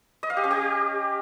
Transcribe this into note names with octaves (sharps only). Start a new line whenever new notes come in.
D#5
F5
G4
C#4
G4